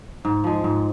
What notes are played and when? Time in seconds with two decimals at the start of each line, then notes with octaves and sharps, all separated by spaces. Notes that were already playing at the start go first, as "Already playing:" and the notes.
0.25 G#2
0.44 F3 G#3
0.64 G#2